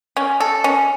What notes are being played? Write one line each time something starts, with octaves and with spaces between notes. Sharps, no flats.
C#4
A4
C#4